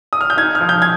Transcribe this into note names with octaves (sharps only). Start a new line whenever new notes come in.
D#6
F6
G6
D#4 G#6
F6
F3
G6
G#6